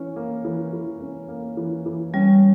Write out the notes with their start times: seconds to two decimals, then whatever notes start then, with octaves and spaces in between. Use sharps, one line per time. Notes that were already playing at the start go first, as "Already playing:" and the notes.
Already playing: E3 C#4
0.16 A#3
0.45 E3
0.73 E3
1.00 C#4
1.28 A#3
1.57 E3
1.86 E3
2.14 G3 C#4